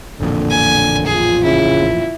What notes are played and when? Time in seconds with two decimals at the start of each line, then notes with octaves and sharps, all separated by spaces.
0.21 A1 F2 A#2 D3 A#3
0.51 G#5
1.06 F4 G#4
1.44 C#3 E4